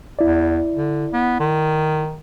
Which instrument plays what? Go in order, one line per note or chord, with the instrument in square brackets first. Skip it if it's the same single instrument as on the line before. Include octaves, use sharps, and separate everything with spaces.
[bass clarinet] E2 [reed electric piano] E4 D5
[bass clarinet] D3
B3
D#3